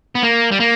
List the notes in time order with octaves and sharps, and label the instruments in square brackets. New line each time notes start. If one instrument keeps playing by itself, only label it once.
[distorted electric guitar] B3
A#3
G3
A#3